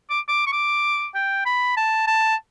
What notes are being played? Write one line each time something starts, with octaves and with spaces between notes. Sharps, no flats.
D6
D6
C#6
D6
G5
B5
A5
A5